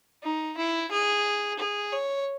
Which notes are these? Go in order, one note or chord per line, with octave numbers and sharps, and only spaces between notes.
D#4
E4
G#4
G#4
C#5